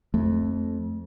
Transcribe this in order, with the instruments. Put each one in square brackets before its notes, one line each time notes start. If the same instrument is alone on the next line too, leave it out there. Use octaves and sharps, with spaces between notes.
[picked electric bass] F2 [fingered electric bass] A3